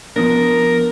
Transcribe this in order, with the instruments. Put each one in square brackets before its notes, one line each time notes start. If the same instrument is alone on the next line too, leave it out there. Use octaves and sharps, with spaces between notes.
[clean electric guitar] F3 B3 D4 [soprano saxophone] A#4